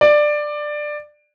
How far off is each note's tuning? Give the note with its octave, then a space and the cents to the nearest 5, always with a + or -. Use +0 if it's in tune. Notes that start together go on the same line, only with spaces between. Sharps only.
D5 +15